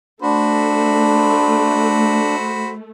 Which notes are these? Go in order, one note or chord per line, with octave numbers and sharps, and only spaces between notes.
A3 D4 F#4 C5 B5